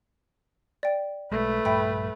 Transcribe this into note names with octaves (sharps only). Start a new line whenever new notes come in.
D5 G5
B1 G#3 A3 B4
A#1 G2 E5 G5 B5